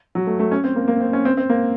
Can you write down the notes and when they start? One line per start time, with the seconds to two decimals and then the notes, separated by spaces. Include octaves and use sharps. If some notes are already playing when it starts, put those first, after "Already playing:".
0.15 F#3
0.27 A3
0.39 A3
0.52 C#4
0.64 C4
0.76 A#3
0.88 A#3
1.00 C4
1.13 C#4
1.25 C4
1.37 C4
1.50 A#3